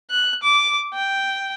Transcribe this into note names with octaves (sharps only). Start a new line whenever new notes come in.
F#6
D6
G5